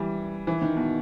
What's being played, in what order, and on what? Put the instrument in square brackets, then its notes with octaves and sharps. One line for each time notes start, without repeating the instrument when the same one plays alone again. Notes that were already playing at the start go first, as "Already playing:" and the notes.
Already playing: [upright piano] E3 G3
E3
D#3
B2